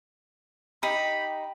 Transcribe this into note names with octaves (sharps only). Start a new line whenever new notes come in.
D#4 G4 B5